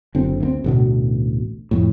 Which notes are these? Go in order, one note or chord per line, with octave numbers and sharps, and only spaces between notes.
F#1 D3 C4
D2 A#3 C4
A1 D2 B2
F2 A2